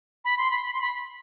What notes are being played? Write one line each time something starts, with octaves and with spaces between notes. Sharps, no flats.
B5
C6
B5
B5
C6
B5